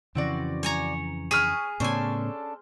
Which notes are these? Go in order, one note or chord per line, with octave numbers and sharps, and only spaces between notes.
F2 C#3 E3 C4 F#4 D5
C#5 G#5 A#5
G#4 C#5 B5 F6 D#7
A2 C#3 B3 C#4 D4 A4 C5 G#5